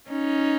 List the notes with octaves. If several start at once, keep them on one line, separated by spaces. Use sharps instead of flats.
C#4 D#4